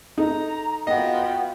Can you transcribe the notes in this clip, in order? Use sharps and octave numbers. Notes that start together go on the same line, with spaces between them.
D#4 A4 A#5
B3 F4 F#4 D#5 G5